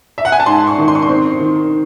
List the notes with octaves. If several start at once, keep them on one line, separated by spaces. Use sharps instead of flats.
E5
F#5
G#5
A5
G#2 C6
C#6
D#3
C6
C#6
C6
C4
D#3